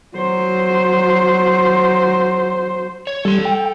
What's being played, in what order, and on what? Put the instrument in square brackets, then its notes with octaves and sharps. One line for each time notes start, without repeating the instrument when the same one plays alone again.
[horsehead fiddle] F#3 C5
[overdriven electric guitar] C#5
[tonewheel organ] G3 [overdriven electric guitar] A4 C6
[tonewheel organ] G5